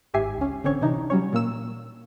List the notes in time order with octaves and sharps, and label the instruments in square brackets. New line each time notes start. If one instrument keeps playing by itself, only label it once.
[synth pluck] G#1 G#2 G4 E5 G#5 C7
C#2 C#4
A1 D3 C4 C#4 C#5 C#6
C3 E3 D4 D#4
F#3 G3 C#4 C#5
A#2 A#3 E6 E7